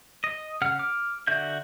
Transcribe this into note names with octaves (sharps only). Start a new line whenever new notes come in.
D#5
C#3 F#5 F6
D6 F6
D3 F#4 E5 G6